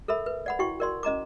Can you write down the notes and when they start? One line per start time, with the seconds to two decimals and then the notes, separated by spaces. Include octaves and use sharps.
0.08 A4 A#4 E5 B5
0.26 B4
0.46 D5 F#5 B5
0.59 E4 F#4 G5 C#6
0.80 A#4 D5 C6
1.03 C#4 D#5 A#5 D6